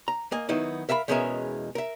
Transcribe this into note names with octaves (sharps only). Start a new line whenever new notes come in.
A#5
A#3 D#5 G#5
D#3 F#3 B3 D#4 E4
A#4 E5 F5 G#5 B5
E2 B2 G#3 C#4 A#4 E5
A#4 E5